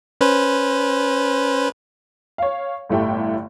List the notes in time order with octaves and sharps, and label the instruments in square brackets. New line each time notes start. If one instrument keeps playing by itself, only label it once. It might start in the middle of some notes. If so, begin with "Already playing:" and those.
[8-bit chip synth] C#4 B4 C5
[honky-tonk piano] C#5 F5
G1 A2 A3 G4 G5